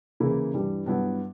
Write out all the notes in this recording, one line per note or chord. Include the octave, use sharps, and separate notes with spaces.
C#3 E3 A#3 E4
G2 E3 G3
G2 F#3 B3 E4